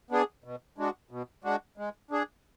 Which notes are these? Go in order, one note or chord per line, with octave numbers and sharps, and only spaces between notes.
B3 D4 G#4
B2
G#3 D4 F#4
B2
G#3 D4 F#4
G#3
D4 G#4